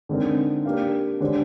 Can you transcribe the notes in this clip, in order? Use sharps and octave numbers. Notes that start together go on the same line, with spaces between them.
D3 G#3 C4 D#4 A#4
A#3 D4 G4 A#4 F5
D3 G#3 D4 G4 C5